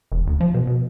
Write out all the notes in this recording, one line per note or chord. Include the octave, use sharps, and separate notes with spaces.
E1
D2
F3
B2
B2